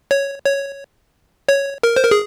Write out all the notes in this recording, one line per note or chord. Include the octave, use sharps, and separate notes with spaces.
C#5
C#5
C#5
A#4
C5
A#4
G#4